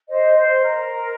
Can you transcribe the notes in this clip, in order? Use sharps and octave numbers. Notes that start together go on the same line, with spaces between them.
C5 D#5
C5
A#4